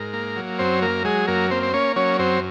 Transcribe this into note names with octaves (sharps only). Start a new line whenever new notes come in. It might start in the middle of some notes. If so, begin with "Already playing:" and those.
Already playing: G#2 A#4
A#3
F#3
F#2 C4 C5
A#3 A#4
F#3 G#3 G#4
F#2 A#3 A#4
A#3 C4 C5
C5
A#3 C#4 C#5
F#3 C#4 C#5
F#2 C4 C5